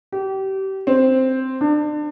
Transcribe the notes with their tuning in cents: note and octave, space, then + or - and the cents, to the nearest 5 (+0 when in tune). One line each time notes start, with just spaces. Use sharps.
G4 -30
C4 +0
D4 +30